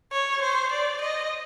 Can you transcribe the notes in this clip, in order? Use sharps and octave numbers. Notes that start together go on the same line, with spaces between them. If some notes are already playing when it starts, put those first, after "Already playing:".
C#5
C5
D5
D#5